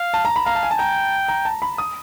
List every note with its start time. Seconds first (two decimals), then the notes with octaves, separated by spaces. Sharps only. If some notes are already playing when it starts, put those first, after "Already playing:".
Already playing: F5
0.14 A5
0.25 A#5
0.36 B5
0.46 F5 A#5
0.55 A5
0.63 G#5
0.71 A5
0.79 G5 A#5
1.28 A#5
1.45 A5
1.62 B5
1.78 D#6